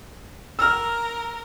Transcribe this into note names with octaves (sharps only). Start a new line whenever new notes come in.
A#4 E6 F6